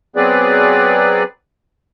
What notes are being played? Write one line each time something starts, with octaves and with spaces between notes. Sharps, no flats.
F#3 B3 C4 G#4 B4 D5